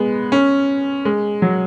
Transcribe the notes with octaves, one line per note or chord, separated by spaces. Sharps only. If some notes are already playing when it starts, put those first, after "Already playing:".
Already playing: G#3 B3
C#4
G#3
F#3